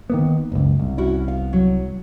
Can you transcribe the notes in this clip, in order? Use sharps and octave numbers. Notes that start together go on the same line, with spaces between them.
D#3 A#3 B3
F#1 C#2
C2
C#4 E4 F#4
B3 F5
F#3